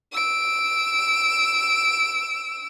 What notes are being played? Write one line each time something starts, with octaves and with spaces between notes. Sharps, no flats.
E6 D7